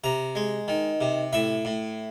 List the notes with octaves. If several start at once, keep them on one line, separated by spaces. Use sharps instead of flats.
C3 A#5
G#3
D#3
C3
A2 E5
A2